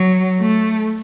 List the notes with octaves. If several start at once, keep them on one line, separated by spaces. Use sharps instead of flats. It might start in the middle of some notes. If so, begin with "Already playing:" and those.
Already playing: F#3
A3